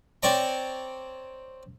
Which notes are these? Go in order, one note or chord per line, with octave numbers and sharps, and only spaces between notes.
C4 C#5 D5 A#5